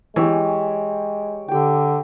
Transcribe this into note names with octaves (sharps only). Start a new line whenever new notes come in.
E3 G#3 G4 C#5
D3 G4 G5